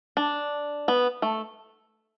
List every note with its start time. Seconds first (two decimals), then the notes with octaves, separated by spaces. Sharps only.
0.17 D4
0.88 B3
1.22 A3